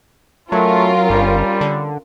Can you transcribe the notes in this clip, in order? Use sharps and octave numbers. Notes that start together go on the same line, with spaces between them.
F#3 A3 C#4 F4 A#4
G1 G3
D3